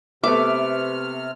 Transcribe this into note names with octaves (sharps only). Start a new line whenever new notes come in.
C3 A3 B3 E5 D6 F6